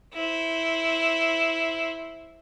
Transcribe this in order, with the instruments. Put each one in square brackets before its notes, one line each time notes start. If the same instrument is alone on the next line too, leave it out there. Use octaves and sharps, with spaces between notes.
[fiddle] E4 C5